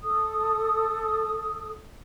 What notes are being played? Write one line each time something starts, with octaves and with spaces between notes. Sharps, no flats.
A4 D#6